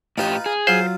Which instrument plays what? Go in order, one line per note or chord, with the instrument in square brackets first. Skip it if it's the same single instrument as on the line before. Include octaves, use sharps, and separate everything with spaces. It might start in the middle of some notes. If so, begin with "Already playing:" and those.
[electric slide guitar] A2 G4 [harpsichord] D#4 F4 B4
[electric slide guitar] G#4
[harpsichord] F#3 F4 [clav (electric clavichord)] C5